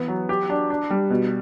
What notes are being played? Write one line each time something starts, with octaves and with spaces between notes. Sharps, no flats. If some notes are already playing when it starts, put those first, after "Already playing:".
Already playing: E3 B3
F#3
G4
D4
D4
G3
B2